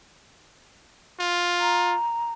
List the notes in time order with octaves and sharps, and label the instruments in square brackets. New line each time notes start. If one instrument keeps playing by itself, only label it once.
[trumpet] F4
[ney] A#5